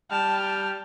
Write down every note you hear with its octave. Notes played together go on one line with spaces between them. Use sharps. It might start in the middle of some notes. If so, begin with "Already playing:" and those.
G3 G5 A5 F6
A5